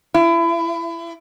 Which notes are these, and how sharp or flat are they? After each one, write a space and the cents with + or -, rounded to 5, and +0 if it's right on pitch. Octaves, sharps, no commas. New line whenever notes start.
E4 +30